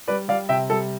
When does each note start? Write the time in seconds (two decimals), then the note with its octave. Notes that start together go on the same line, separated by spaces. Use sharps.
0.08 G3 B4 D5
0.28 G3 D5 F5
0.49 C3 E5 G5
0.70 G3 A4